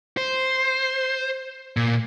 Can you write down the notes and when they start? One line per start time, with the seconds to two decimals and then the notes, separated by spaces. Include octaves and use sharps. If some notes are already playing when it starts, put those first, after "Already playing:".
0.17 C5
1.77 A#2